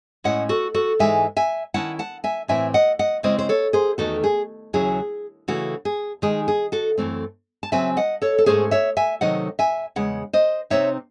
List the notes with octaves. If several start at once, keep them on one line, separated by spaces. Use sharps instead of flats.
A2 G#3 C#4 E4 D#5 F#5
F#4 A4
F#4 A4
G#2 E3 G#3 D#4 E5 G#5
E5 G#5
D#3 A3 C#4 E4 F#5 A5
F#5 A5
E5 G#5
A2 E3 C4 E4 E5 G#5
D#5 F#5
D#5 F#5
C#3 G#3 C4 E4 C5 D#5
C5
A4 C#5
G#4 C5
E2 D#3 A3 D#4 F#4 A4
G#4
D#2 C#3 F#3 C#4 E4 G#4
C#3 E3 A3 F#4
G#4
D#3 G#3 D#4 G#4
G#4
F#4 A4
F#2 E3 A3 C4
A5
C#3 F#3 C4 E5 G#5
D#5 F#5
A4 C#5
A4
G#2 F#3 A3 C#4 G#4 C5
C#5 E5
E5 G#5
C3 D#3 F#3 A3 D#4 D#5 F#5
E5 G#5
E2 C#3 G#3 F#5
C5 D#5
C3 F#3 C4 D#4 C#5 E5